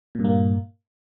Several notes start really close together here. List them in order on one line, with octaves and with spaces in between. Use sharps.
A#2 G2 A#3